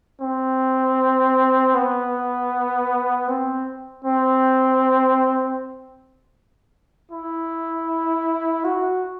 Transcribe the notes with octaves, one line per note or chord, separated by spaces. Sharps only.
C4
B3
C4
C4
E4
F#4